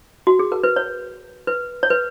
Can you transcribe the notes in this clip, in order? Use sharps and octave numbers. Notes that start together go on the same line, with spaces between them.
F#4
G#4
A#4
B4
C#5
B4
C#5
B4